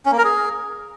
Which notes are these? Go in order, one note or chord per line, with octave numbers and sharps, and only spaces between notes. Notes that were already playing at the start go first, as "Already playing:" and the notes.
C#4
A#3
A#4
G#4